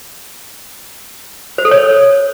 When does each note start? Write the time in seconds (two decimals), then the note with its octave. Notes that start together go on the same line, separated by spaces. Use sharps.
1.58 C5
1.65 A4
1.71 C#5